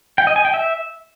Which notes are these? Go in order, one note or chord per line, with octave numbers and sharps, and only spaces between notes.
G5
D#5
G#5
G5
E5